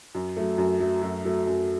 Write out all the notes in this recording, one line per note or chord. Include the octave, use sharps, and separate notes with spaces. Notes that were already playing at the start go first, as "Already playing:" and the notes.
F#2
F#3 A3
F#2
F#3 A3
F#2
F#3 A3
F#2